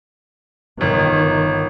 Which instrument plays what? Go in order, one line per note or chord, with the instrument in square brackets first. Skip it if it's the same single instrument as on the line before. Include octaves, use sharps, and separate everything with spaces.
[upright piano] G1 [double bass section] D#3